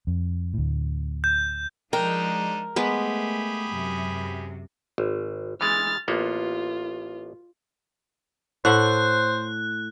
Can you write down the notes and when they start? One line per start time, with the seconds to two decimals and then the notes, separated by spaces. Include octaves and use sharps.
0.07 F2
0.54 D2 A2
1.24 G6
1.93 F3 G#3 D4 D#4 A#4 G5
2.76 G#3 A3 B3 G4 G#4 B4 B5
3.69 F#2 C3
4.98 G#1
5.61 E3 G#3 F6 A6
6.08 A1 A#3 B3 F4
8.65 A2 A4 C5 F#5 F#6